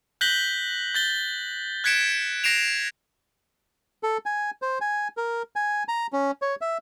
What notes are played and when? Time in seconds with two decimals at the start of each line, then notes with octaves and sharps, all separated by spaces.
0.21 F#6 G6 A#6 B6 F#7 G7
0.95 G6 A6 G7
1.84 F#6 G#6 B6 C#7 D7 E7
2.44 A#6 C7 D7 E7 F7
4.03 A4
4.26 G#5
4.62 C5
4.81 G#5
5.17 A#4
5.56 G#5
5.88 A#5
6.13 C#4
6.42 C#5
6.61 E5